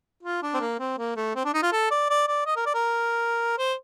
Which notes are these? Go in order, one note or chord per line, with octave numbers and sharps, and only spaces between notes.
F4
D4
C4
A#3
C4
A#3
A3
C4
D4
D#4
F4
A4
D5
D5
D5
D#5
A#4
D5
A#4
C5